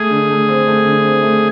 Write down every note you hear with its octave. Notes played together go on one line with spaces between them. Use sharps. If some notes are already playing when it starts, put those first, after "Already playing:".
Already playing: A3 G#4
D3
A3
C4
A3
D3
C4
A3